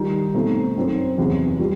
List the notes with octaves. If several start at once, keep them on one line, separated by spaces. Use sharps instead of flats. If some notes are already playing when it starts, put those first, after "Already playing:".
Already playing: D#3 G3 D#4
B2 A3 C4 D#4
F#2 F#3 C4 D#4
E2 C3 F#3
G3